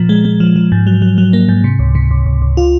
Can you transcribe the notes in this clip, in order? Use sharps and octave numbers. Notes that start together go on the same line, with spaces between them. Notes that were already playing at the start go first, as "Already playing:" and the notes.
Already playing: A#2 F3
G#3
G#3
F3
F3
G#2
F#3
F#3
F#3
A#3
G#2
C3
C#2
C3
C#2
C#2
C#2
F4